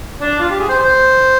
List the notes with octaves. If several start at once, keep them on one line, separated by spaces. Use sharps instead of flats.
D4
F4
G4
G#4
C5
C5